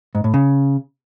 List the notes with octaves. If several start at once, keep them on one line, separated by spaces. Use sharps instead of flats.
G#2
A2
C#3